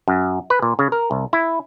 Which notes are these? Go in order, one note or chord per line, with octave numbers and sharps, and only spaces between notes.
F#2
B4
A#2
C#3
A#4
C2
E4